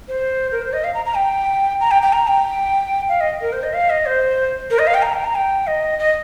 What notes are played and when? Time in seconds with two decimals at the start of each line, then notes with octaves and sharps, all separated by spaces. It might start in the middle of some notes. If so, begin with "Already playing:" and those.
0.09 C5
0.52 A#4
0.62 C5
0.73 D#5
0.84 F5
0.94 A#5
1.05 A#5
1.16 G5
1.80 A#5
1.91 G5
2.02 G5
2.13 A#5
2.29 G5
3.09 F5
3.21 D#5
3.41 A#4
3.53 C5
3.63 D#5
3.74 F5
3.90 D#5
4.06 C5
4.70 A#4
4.79 D#5
4.87 F5
4.94 G5
5.02 A#5
5.13 G5
5.24 A#5
5.35 G5
5.67 D#5
5.99 D#5